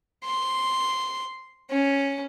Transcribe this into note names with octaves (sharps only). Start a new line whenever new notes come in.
C6
C#4